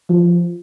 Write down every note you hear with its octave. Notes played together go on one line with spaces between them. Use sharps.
F3